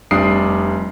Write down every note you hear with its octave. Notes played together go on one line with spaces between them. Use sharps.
F1 G3 D4 D#6 C7